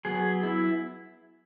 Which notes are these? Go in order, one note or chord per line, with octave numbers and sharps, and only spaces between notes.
F#3 B3 G#4
E4